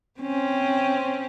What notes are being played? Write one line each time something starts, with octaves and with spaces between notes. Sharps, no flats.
C4 C#4